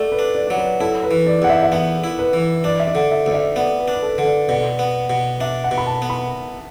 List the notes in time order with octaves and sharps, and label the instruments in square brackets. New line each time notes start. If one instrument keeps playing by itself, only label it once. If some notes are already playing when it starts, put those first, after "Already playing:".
Already playing: [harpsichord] A3 [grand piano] D5 F#5
[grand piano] B4
[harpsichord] D4
[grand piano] D5
[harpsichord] F#3 [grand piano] D5
[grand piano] B4
[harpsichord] E4 [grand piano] A4
[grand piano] B4
[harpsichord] E3
[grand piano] D5
[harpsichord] E2 [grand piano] F#5
[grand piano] E5
E5
[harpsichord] B3 [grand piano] F#5
[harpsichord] E4
[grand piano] B4
[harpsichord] E3
[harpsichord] D4 [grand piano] D5
[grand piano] E5
D5
[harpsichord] D3
[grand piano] E5
[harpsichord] D2 [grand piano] D5
[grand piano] E5
[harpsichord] B3 [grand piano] D5
[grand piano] B4
[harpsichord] D4
[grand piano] B4
A4
[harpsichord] D3
[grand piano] D5
[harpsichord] B2 [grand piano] D5
[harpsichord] B3
B2
[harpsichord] D4 [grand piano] E5
[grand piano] F#5
[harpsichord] B2
[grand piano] B5
A5
[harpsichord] B3
[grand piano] B5